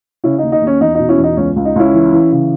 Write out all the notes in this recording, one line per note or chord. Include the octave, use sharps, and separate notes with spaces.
C#3 C#4 E4
D#2 D#4
D#4
D#2
C#4
E2 D#4
B2 D#4
C#4 E4
E2
D#4
C#2 C#4
C#2
D#4
C#2 C#4 E4
E3
E3
C#3